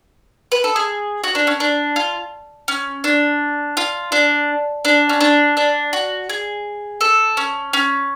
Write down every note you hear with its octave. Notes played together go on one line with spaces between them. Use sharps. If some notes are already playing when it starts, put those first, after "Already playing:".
B4
A4
G#4
F#4
D4
C#4
D4
F4
C#4
D4
F4
D4
D4
C#4
D4
D4
F#4
G#4
A4
C#4
C#4